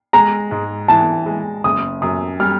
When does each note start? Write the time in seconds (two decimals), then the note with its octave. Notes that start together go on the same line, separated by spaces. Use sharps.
0.13 G#3 A#5
0.51 G#2
0.88 E3 A5
1.26 G#3
1.64 F#1 D#6
2.02 F#2 D#6
2.40 G3 F6